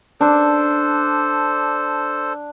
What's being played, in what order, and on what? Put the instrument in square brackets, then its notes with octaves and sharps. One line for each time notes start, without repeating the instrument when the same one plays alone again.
[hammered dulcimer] D4 [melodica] A4 C5